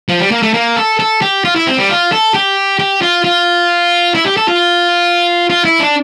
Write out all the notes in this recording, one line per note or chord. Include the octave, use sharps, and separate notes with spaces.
F3
G3
A#3
A3
A#3
A4
A4
G4
F4
E4
C4
G3
F4
A4
G4
G4
F4
F4
E4
G4
A4
F4
F4
E4
D4